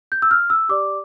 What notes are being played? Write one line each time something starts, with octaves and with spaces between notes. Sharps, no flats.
G6
E6
F6
E6
G4 D5 D6